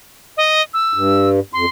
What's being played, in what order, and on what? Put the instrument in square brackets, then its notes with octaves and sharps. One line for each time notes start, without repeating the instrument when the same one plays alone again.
[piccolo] D#5
E6
[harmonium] G2
[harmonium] F2 [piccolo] C6